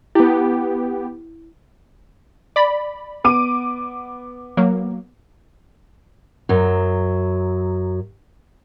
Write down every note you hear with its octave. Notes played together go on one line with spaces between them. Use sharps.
B3 E4 G4
D5 B5
B3 D6 D#7
F#3 A#3
F#2 F#3